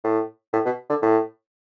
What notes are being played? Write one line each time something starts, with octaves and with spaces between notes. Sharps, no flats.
A2
A2
B2
D3
A2